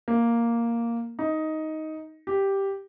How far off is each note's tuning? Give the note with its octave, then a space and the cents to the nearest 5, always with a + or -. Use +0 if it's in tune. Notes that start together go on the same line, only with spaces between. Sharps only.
A#3 +0
D#4 +10
G4 +0